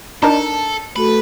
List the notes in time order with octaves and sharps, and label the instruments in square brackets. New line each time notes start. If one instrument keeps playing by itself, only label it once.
[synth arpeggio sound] D4 D#4 A#4 [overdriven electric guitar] A4
[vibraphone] A3 F#4 A4 [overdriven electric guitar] B4